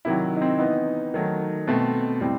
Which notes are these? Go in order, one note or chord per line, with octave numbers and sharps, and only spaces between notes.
C3 D#3 F#3 E4
D#4
C4
E3 B3 D#4
D#3 F#3 A3
B2 A3 C4
A2 G3 C4